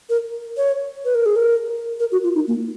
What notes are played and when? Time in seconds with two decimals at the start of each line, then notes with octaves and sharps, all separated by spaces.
0.10 A#4
0.57 C#5
1.05 B4
1.15 A#4
1.26 G#4
1.36 A#4
2.00 A#4
2.12 F#4
2.24 F4
2.35 D#4
2.48 A#3